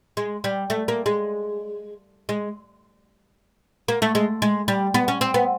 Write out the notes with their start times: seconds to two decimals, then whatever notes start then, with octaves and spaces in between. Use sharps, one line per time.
0.17 G#3
0.44 G3
0.70 A3
0.88 A#3
1.06 G#3
2.29 G#3
3.88 A#3
4.02 A3
4.15 G#3
4.42 G#3
4.68 G3
4.94 B3
5.08 C#4
5.21 C4
5.34 B3